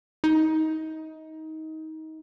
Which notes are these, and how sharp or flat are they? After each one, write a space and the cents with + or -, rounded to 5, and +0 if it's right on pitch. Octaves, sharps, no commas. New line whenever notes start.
D#4 +25